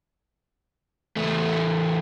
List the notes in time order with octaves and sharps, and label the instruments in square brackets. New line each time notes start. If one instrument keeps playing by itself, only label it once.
[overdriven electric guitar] E2 A3